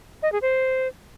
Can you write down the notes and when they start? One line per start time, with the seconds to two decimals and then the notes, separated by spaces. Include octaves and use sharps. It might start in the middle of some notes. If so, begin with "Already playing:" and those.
0.23 D#5
0.32 G#4
0.42 C5